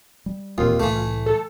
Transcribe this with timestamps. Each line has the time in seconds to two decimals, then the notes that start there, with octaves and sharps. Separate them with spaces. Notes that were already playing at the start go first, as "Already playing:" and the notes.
0.26 G3
0.58 E1 D#2 A#2 C4 F4
0.80 C2 A2 E3 A3
1.26 A4